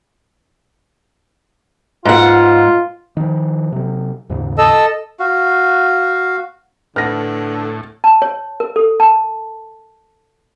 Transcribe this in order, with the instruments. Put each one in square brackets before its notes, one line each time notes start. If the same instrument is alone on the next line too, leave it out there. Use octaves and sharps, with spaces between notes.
[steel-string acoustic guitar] G#2 F#5 [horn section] F4
[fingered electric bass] D#3 F3
C3 F#3
D#2 G#2 C#3
[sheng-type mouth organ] A4 D#5 E6
[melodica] F#4 F5
[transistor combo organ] A2 [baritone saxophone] D3 [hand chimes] B4 F#5 [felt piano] F6 A#6
[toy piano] A5
C#5
A#4
A4
A5